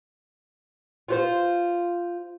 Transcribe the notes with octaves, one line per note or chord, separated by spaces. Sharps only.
F4 F#4 C5